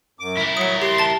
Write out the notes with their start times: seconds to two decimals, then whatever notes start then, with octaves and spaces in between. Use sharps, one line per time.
0.19 F#2 D6
0.37 E4 A#4
0.57 F#3 D#6 C#7
0.82 G4 C6
0.98 A5 A6